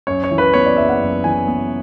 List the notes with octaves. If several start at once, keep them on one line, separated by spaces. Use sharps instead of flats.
F#2 C#5
C#5
E3
B4
B3 C#5
D5
F#1 E5
F#5
F#2
E3 G#5
B3